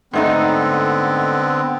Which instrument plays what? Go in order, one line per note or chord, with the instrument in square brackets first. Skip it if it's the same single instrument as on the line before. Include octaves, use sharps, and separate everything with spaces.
[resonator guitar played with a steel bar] G#2 A3 D#4 [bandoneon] D3 B3 C4